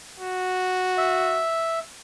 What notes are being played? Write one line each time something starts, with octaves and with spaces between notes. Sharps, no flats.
F#4
E5